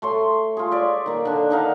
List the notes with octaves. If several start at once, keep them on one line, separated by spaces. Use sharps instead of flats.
A3 C#5 C6
F4 G#4
C#5 D5 E5
D#3 A#3
D3 D4
D#3 D#4 F5 F#5